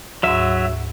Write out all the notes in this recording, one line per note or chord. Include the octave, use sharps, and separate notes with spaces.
D2 G#2 F#3 E5